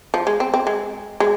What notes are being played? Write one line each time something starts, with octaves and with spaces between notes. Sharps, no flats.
F3
G#3
C4
C4
G#3
G#3